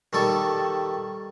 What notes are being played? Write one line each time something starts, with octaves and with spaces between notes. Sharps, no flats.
D#3 G3 A4 C#6